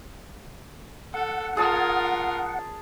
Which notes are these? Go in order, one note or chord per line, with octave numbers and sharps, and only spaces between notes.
A4 F#5
F4 G#4 A#4 A5 D#6